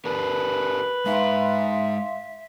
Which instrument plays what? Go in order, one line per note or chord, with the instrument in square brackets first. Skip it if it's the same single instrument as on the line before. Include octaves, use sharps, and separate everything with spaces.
[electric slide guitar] D4 G4 A#4 [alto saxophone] B4
[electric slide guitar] G#3 D#4 [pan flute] E5 [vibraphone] F5 C6